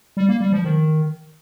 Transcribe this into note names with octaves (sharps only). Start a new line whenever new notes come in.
G3
A#3
G3
F3
D#3